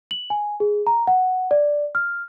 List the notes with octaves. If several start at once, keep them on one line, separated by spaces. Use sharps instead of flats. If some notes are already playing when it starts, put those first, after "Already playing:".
F#7
G#5
G#4
A#5
F#5
D5
F6